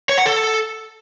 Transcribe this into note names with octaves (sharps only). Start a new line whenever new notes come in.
C#5
F#5
A4